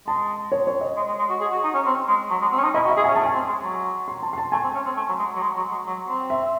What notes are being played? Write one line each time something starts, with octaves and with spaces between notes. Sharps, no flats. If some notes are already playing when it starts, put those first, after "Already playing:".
G#3 A5
C#5
C#5
D#5
G#3
G#3
G#3
F#4
G#4
F#4
D#4
C#4
C4
G#3
F#3
G#3
C4
C#4
D#4
E4 D#5
F#4
E5
G#4
C#4 G#5
A3 A5
G#5
C4
G#3
F#3
C6
A5
C6
A5
A3 G#5
C4
C#4
C4
A3
F#3
G#3
F#3
G#3
F#3
G#3
F#3
C4
E5